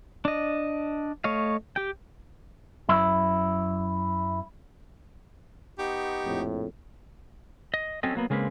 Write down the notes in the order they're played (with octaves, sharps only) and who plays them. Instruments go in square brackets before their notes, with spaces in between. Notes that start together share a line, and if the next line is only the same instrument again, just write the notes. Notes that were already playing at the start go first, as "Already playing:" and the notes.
[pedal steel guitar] D4 D#5
A3 C#5 D#5 F5
G4 G5
[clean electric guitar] F#2 E4
[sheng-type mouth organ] B3 D#4 C#6 [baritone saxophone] G4
[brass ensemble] A#1 F2 A2
[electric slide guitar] D#5
F#3 C4 C#4 A4 D#5
F#3 A#3 B3
C#3 G#3 A#3 C4 B4